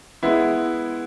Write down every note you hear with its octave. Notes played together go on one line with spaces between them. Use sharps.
G#3 B3 E4